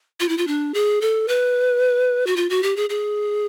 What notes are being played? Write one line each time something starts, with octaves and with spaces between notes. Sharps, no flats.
F4
E4
F4
D4
G#4
A4
B4
F#4
F4
F#4
G4
G#4
G#4